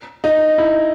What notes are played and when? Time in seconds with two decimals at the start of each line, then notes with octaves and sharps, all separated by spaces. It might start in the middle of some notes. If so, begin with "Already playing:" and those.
0.24 D#4
0.58 E4